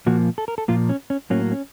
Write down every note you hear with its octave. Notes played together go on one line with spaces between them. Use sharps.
A#2 F3 A#3 F#4
A4
A#4
A4
A#2 F3 A#3 F4
C#4
C#4
A2 F#3 A#3 C#4
C#4